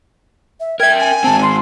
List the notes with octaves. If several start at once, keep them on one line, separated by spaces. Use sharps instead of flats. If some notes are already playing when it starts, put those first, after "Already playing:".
E5
A#4 E5 G5 G#6
G#5
G#2 C4 A5
C6